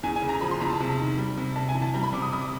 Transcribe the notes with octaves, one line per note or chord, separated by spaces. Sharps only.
E2 G#5
G#5
C#3
A#5
F3 B5
C6
E2 A#5
A5
C3
D#3
G3
C3
C3 A5
G#5
E3
A5
G3 A#5
B5
C3 D6
D#6
C3 D#6
D6